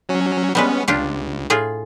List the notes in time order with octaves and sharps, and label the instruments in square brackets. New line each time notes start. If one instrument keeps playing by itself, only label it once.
[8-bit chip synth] F#3 C#4
[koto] G3 G#3 B4 [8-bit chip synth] B3 C#4
[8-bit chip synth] C#2 [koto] D4 F4 G4
[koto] A2 F4 G#4